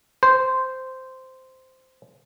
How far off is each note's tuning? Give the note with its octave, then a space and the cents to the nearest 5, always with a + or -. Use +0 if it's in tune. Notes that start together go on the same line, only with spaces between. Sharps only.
C5 -10